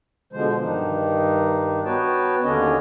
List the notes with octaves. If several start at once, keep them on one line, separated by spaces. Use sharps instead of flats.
B2 D3 F3 G#3 C5
G2 D#3 D4 D#4
B3 F#4 B4 C#5 G5 A5
D#2 D3 C#4 D4 C#5 D#5